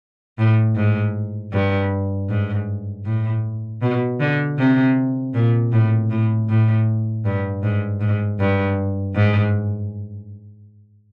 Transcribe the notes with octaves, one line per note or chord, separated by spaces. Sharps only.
A2
G#2
G2
G#2
A2
B2
D3
C3
A#2
A2
A2
A2
G2
G#2
G#2
G2
G#2